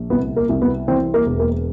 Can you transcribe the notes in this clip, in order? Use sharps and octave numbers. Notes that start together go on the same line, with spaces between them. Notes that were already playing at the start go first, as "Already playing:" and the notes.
Already playing: A#1
C2 B3
A#3
C2
B3
E3 C4
A#3
E1
A#3